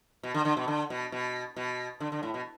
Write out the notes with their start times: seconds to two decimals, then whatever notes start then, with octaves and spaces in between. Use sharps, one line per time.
0.23 B2
0.34 D3
0.45 D3
0.57 B2
0.68 D3
0.90 B2
1.12 B2
1.56 B2
2.00 D3
2.12 D3
2.23 A2
2.34 B2